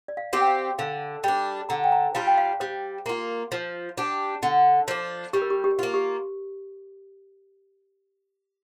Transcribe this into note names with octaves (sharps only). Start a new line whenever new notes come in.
D5
F5
C4 G4
G5
F5
D3 F5
G3 D4 G5
D3 A#5
G5
A#5
G3 D4 F4 F5
G5
F5
G3 C5
A#3 F4
F3
D4 G4
D3
F3 D4
G3 G4
A#4
G4
G4
A#3 F4
G4